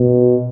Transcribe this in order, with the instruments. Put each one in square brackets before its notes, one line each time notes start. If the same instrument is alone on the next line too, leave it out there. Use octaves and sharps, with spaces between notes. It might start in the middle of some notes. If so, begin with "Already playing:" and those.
Already playing: [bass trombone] B2